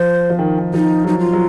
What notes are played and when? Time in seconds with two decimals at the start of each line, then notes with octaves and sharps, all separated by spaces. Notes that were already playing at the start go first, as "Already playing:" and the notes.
Already playing: F3 C5
0.30 F3
0.39 D#3
0.59 D#3
0.74 F3 D#4
1.04 F#3 D#4
1.19 F4
1.33 F#3